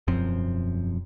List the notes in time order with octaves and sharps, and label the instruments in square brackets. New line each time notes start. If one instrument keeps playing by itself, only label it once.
[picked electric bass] E1 F#2 F3 C4